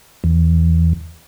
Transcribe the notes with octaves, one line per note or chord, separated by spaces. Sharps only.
E2